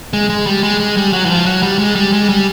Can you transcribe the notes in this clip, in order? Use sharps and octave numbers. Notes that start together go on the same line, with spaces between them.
G#3
G#3
G3
G#3
G#3
G3
F#3
E3
F3
F#3
G3
G#3
G3
G#3
G3